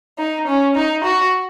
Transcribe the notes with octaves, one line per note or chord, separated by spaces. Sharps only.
D#4
C#4
D#4
F#4